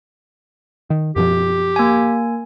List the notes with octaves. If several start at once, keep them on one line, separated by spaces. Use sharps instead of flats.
D#3
F#2 B2 F3 G4
A#3 G#5